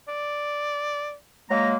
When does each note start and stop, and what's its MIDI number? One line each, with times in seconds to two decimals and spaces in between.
0.08 1.15 74
1.50 1.77 54
1.50 1.77 56
1.50 1.77 58
1.50 1.68 82